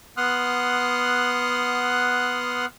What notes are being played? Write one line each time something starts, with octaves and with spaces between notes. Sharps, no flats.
B3 F#5 C6 D#6 F6 F#6